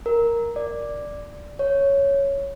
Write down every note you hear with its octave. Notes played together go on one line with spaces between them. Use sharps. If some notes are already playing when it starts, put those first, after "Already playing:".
A#4
D5
C#5